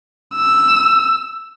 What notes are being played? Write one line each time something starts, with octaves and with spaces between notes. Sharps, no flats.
E6